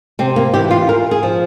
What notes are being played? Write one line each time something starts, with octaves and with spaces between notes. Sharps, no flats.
C3 C4
A#3
E3 G4
F4
A#2 A#4
G#4
F3